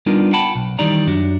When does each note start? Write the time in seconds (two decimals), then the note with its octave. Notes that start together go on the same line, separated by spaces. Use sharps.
0.06 G3 B3 D4 D#4 F4 A#4
0.33 F#5 G5 A5 B5
0.55 B1
0.79 D#3 E3 G3 D#4 D5 A#5
1.07 F#2 D4 F#4